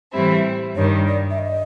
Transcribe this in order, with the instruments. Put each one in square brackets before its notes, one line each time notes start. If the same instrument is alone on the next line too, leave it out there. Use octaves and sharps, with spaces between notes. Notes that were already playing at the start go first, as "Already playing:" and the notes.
[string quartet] A2 E3 G3 C4 E4
[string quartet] G2 D#3 G3 [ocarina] C#5
[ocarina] D5
E5
D#5